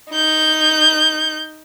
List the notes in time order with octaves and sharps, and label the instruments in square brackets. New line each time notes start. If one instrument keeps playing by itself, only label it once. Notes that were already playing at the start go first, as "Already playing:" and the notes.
[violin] D#4 G6